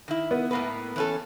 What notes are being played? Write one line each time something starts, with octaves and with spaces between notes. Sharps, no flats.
D#3 E4
B3
A2 A#3 B4
E3 C#4 A4